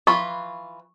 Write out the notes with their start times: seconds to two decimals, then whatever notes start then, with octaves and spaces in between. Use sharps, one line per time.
0.07 E3 F4 B5 C#6